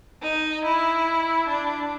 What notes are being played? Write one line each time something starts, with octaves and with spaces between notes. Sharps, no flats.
D#4
E4
D4